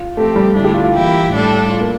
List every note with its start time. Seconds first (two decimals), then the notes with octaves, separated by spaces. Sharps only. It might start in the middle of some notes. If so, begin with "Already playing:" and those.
Already playing: F4
0.16 F3 A3 C4 G4
0.36 G3
0.55 D3 A3 D4 E4
0.64 G4
0.74 F4
0.84 F4
0.94 E3 A#3 E4 G4
1.31 A2 G3 D4 A4
1.70 F4
1.80 A#3